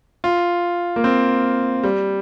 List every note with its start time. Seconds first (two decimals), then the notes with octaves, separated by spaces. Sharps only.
0.24 F4
0.96 A#3
1.04 C4
1.83 G3